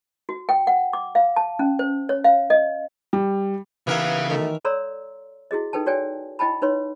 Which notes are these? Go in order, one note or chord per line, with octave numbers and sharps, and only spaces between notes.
F#4
G5
F#5
D6
F5
A5
C#4
C5
C#5
F5
D#5
G3
D#2 C#3 E3 B3 E4 A#4 E5 F5
B2 D#3 A3
A4 C#5 D5 A#5 C6 E6
E4 F#4 G#4 D#5
D#4 A4 B4 G5 A5
F#4 C#5 D5 G5 G#5
E4 D#5 G5 A5 B5
D#4 B4 C#5 C6